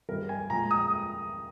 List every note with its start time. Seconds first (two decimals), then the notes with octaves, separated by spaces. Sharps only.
0.09 G2 G3 A#4
0.29 G#5
0.50 A#2 G#3 A#5
0.71 D#6